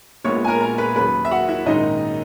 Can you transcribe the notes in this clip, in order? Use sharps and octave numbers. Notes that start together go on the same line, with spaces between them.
A#1 A#2 G#3 B3 C#5 C#6
G#5
A#4 A#5
A#4 A#5
B4 B5
D#2 C#3 F#3 C#4 B4 B5
E5
F#4 F#5
E4 E5
A#1 G#2 D#3 G#3 C#4 D#4 D#5